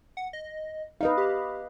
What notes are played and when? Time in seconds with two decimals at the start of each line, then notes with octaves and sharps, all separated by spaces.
0.17 F#5
0.33 D#5
1.01 D#4 B4 D#5 F5
1.18 G4